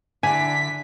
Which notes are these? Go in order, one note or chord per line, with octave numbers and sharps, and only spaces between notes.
D3 D4 E4 G#5 B6